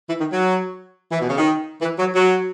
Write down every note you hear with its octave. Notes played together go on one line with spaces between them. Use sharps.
E3
D#3
F#3
E3
B2
C#3
D#3
E3
F#3
F#3